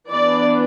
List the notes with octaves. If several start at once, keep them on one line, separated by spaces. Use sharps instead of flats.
E3 B3 D4 D5